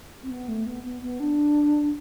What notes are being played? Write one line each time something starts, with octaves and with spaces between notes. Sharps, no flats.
C4
B3
A3
B3
B3
B3
D4